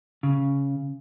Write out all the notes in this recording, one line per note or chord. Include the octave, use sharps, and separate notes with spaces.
C#3